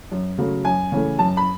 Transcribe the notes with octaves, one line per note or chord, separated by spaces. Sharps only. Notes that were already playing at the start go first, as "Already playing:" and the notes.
F#2
C#3 F#3 A3
F#2 G#5
C#3 E3 A3
F#2 A5
B5